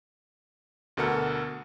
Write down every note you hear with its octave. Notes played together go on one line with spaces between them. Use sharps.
D2 B2 A4 A#4 F#5 C#7